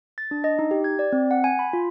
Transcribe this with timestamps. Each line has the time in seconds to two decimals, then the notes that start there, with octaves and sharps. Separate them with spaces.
0.18 A6
0.31 D4
0.44 D#5
0.59 D#4
0.71 G4
0.84 G#6
0.99 D5
1.12 C4
1.31 F#5
1.44 G#5
1.59 B5
1.73 F4